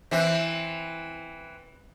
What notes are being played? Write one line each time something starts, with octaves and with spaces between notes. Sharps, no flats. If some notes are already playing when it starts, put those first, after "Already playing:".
E3 C4 E5 F#6